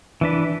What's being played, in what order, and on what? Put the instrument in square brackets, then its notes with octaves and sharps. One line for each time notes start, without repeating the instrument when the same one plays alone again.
[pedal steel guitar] E3 D4 B4